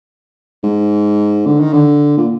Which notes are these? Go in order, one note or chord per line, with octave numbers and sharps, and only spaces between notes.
G#2
D3
D#3
D3
A#2